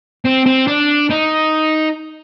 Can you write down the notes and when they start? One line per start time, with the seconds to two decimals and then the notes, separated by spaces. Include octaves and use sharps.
0.25 C4
0.46 C4
0.67 D4
1.10 D#4